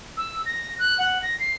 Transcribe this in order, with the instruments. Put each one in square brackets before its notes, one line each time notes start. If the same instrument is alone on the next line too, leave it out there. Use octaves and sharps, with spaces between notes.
[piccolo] E6
A#6
F#6
F#5
A#6
C7